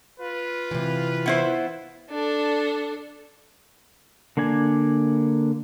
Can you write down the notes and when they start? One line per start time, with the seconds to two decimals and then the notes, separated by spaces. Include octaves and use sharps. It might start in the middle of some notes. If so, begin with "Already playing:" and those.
0.20 F4 B4
0.71 C3 E3
1.26 B3 E4 C5
2.11 D4 A4
4.37 D3 A#3 D4 G#5